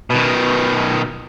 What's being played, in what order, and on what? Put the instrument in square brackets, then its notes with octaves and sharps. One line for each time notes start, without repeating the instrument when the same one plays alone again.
[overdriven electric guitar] B2 D#3